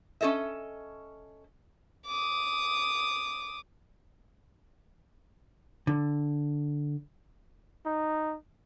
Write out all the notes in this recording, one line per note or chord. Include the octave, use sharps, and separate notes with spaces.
C#4 G4 A4 D#5 E5
D6 D#6
D3
D#4